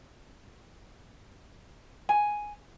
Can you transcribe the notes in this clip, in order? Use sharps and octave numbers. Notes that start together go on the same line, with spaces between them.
G#5